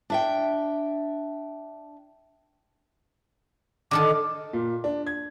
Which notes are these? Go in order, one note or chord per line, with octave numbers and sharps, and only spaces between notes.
D4 E5 G5
D3 D#3 A4 D6
A#2
D4
G#6